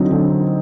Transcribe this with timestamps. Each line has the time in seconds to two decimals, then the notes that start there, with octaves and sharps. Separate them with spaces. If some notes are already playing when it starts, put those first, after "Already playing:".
Already playing: D3 F#3 C4 D#4
0.11 D3